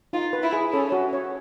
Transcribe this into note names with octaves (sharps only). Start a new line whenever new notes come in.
D#4 F4
B4
E4
G#4
C#4 A4
F#4
C#5